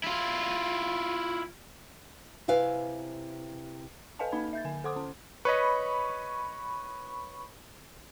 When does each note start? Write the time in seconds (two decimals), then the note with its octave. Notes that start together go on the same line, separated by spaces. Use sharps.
0.04 E4 F4
2.48 C3 E4 B4 F5 G#5
4.19 A4 B4 D#5 F5 G#5 A5
4.32 A#3 D#4 B5 G#6
4.53 E5 G6 A6
4.65 D3 G#5
4.84 A4 C5 F#5 C6 D6 D#6
4.96 C#4
5.45 B4 C#5 D#5 B5 C#6